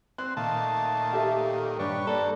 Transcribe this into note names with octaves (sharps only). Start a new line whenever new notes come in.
C4 F#6
A#2 D#3 A3 F5 A5
G4 A4 E5
G2 D4 G4 B4 C#5
A#3 A4 D5